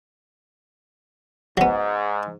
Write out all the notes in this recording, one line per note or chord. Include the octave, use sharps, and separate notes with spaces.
G#2 F#3 B3